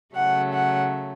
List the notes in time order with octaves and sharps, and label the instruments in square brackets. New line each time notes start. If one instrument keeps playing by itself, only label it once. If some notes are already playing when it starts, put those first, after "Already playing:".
[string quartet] C#3 F#3 A3 F#5
F#5